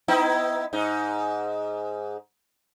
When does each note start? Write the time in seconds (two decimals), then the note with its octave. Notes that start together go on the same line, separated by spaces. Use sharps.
0.08 B3 D#4 E4
0.73 G#2 D#4